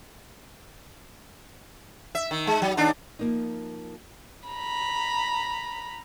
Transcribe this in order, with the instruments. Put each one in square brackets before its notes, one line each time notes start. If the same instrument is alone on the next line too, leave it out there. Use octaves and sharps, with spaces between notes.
[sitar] E5
D#3
G#3
F#3
D#2 D4 D#4
[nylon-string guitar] F3 A#3 D#4
[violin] A#5 B5